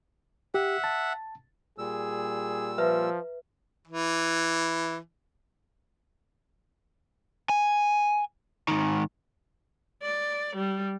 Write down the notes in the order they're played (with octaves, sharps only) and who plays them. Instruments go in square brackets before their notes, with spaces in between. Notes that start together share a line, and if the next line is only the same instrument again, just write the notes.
[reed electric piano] G4 [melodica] E5 F#5
[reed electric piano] A5
[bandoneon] A#2 G3 E6 [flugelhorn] G#4
[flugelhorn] F3 [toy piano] B4 E5 A#5
[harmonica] E3
[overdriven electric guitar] G#5
G#2 D#3
[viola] D5
G3